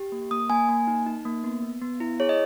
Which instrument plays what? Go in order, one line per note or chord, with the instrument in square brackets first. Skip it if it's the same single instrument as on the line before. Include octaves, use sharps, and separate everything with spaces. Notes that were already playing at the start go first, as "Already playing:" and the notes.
Already playing: [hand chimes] G4
A#3
A#3 D#6
A#3 G#5
A#3
D#4
D#4
A#3
B3
B3
B3
E4
G#4 C#5
D#5